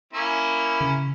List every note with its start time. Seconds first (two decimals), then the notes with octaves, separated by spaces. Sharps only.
0.13 A#3 C#4 E4
0.81 C#3